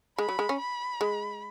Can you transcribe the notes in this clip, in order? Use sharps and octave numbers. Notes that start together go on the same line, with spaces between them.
G#3 B5
F#3
G#3
C#4
B5
G#3